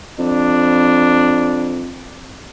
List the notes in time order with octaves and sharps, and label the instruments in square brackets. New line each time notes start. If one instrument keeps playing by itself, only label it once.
[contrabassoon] F2 [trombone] D4